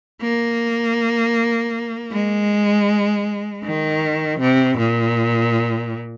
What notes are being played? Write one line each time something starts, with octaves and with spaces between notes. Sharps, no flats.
A#3
G#3
D#3
C3
A#2